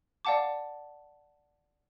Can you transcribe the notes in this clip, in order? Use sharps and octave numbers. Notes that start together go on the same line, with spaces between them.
D5 F5 F#5 A5 D6